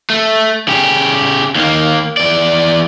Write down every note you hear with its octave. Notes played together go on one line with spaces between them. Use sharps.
A3
C#3 G4
D#2 A#3
E2 D5